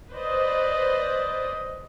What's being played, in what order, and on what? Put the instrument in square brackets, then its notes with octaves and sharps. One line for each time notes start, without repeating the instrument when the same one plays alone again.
[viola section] B4 C5 D5 D#5